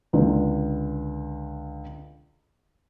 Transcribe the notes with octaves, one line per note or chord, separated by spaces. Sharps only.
C#2 D3